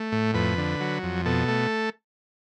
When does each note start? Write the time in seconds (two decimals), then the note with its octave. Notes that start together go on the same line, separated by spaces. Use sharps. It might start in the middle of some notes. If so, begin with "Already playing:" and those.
Already playing: A3
0.12 A2
0.34 F2 B4
0.58 D3
0.81 F#3
1.03 F2
1.26 B2 A4
1.49 A3